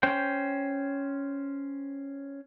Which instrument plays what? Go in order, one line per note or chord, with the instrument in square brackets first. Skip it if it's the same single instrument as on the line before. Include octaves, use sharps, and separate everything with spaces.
[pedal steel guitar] C#4 C5 G5